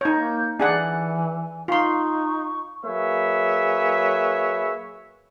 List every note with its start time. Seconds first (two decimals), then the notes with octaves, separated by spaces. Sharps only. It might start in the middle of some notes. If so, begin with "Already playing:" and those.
0.01 D#4 C#5 G6
0.15 A#3
0.60 E3 D4 G#4 F#5 G#5
1.68 D#4 F4 C6 C#6
2.85 F#3 A#3 G#4 B4 C#5 E5